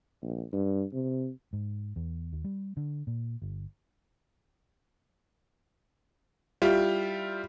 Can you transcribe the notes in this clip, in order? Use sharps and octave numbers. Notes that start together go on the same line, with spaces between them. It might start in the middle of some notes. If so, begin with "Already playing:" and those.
A#1
G2
C3
G#2
E2
D#2
G3
D3
A#2
G1
G3 E4 F4 G4